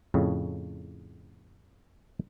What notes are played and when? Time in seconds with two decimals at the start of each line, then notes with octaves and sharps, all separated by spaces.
0.14 F2 A2 C#3